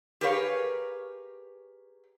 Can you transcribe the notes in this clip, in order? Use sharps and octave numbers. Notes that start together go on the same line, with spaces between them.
G4 G#4 A#4 B4 C#5 F5